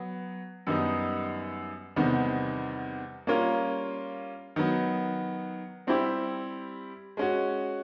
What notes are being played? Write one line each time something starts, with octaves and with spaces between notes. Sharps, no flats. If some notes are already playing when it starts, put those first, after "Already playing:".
Already playing: F#3 B3
F#2 D#3 G3 B3 D#4
E2 C3 D#3 G3 B3
G3 A#3 C#4 F4 A#4
D#3 F#3 B3
G3 C4 E4 G4
G#3 C#4 F#4